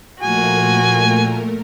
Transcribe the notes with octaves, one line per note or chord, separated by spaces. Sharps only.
A#2 F3 A3 F#4 A#4 G#5